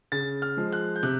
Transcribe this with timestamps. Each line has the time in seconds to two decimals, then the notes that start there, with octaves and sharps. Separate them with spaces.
0.12 C#3 A6
0.42 F6
0.57 F3 G#3
0.73 F#6
0.96 G6
1.03 C3 F#6